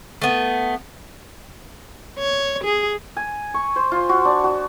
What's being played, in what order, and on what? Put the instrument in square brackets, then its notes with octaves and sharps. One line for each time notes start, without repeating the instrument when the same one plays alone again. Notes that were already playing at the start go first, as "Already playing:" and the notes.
[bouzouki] A3 B3
[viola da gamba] C#5
G#4
[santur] G#5
C#6
C5
F4
F#4
D4
F#4